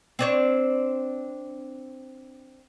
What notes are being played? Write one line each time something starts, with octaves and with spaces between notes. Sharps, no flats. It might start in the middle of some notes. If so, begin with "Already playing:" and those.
C4 D4 C#5